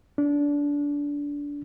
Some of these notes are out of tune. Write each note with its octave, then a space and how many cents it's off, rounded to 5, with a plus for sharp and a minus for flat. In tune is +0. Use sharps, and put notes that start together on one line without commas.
D4 -25